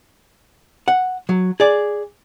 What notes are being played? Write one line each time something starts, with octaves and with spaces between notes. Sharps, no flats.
F#5
F#3
G#4 D5